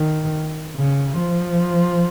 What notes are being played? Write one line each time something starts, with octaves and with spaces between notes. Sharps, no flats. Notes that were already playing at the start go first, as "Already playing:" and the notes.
Already playing: D#3
C#3
F3